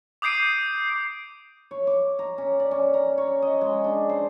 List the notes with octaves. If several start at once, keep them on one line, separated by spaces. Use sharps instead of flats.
D6 D#6 G6 C7 D7 D#7
C#5
D6
A#5
C#4
D5
C#4
A#5
C#5
D#5
G#3
D4
C5